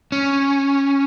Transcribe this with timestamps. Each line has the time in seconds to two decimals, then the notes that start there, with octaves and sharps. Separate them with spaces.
0.12 C#4